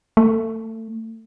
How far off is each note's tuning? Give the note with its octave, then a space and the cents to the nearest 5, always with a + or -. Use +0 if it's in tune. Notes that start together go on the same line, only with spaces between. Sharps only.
A3 +25